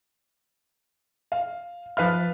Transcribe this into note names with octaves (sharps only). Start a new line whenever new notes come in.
F5
F3 B4 F5 F6